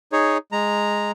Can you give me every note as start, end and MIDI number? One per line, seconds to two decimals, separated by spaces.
0.12 0.38 63
0.12 0.38 68
0.12 0.38 73
0.52 1.11 56
0.52 1.11 82